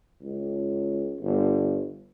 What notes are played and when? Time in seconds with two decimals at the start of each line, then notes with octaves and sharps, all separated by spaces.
0.22 C#2
1.20 G1